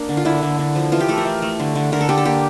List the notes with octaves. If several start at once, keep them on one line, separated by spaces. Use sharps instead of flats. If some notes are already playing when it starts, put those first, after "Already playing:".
Already playing: A#3 D4
D3
F4
D3 E4
D3
D3
F3
E3 F4
G4
A3 A4
A#4
A3
A3
D3
D3
D3 A#4
A4
D3 G4
A4
A#3 G4